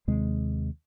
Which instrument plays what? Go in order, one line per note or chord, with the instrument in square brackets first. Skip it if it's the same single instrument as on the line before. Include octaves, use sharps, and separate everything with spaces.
[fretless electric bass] D#2 C3 G#3